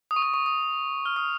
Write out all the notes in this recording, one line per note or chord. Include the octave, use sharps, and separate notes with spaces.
D#6
C#6
D#6
C#6
D#6
F6
D#6